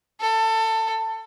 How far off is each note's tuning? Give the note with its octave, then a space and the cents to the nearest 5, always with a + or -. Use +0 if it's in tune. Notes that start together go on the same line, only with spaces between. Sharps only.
A4 +20